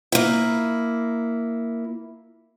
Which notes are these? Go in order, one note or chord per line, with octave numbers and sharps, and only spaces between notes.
A#3 E4